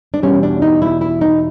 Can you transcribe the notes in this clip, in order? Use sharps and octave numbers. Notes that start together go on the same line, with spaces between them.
D4
E2 B2 G3 C#4
D4
D#4
E4
E4
D#4